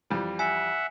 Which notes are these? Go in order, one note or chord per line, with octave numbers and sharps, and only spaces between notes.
F2 E3 G3
E5 F#5 G#5